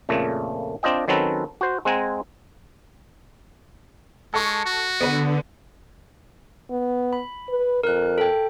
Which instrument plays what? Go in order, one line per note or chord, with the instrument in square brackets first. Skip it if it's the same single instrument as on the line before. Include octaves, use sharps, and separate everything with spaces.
[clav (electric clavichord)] F2 A#2 C#3 A3
C4 D4 F4 D#5 G5
D#3 F#3 C4 C#4 A4 B4
F#4 C5
G#3 C4 F#5 G#5 A#5
[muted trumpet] G#3 [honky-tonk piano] A4 C#6
[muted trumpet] F#4
[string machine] D3 [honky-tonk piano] B3 B4
[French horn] B3
[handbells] B5
[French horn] B4
[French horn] F2 [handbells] A#4 F#6
[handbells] A4 G5